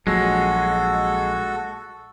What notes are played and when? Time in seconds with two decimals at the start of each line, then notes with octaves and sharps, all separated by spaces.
0.07 A#1 F#3 G#3 F#4 A4